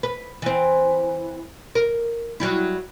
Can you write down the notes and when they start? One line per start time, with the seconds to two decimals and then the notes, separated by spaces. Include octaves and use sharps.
0.03 B4
0.42 E3 C4
1.75 A#4
2.40 F#3 G3 E4